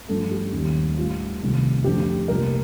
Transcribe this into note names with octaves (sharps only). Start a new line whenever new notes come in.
G2 F3 A3 A4
G4
D#2 D#3 G3
A2 G3 F4
C2 C3 D#3 A3
F2 D3 A3 G4
C2 A#2 A3 A#4